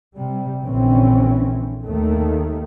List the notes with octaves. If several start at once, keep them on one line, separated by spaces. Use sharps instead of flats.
C3 G3
A#1 D3 E3 C4 C#4
D#2 D#3 A3 A#3